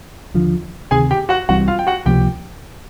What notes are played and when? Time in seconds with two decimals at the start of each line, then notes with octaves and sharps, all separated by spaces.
0.34 D#2 D3 F3
0.91 D2 C3 D#3 G#4 G#5
1.11 G4 G5
1.29 F#4 F#5
1.49 C2 C3 E3 G3 F#4 F#5
1.68 F4 F5
1.79 G5
1.87 F#4 F#5
2.06 C#2 C3 F3 A#3 G4 G5